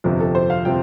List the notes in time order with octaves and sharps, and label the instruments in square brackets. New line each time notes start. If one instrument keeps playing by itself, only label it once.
[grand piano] G1 F2 C3 F3
A4
C5
F5
C3 F3 G5